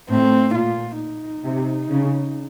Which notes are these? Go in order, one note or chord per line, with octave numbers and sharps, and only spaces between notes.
A2 C4
A#2 F4
D#4
C3
C#3